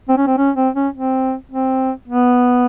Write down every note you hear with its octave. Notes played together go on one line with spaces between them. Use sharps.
C4
C#4
C4
C#4
C4
C#4
C4
C4
B3